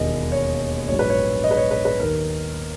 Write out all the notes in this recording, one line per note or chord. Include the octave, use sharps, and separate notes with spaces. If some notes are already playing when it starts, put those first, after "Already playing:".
Already playing: E1 D#2 D#3 D#5
C#5
A#1 G#2 F#3 C#5
B4
C#5
D#5
B4
C#5
B4
B4
D#2 D#3 A#3 A#4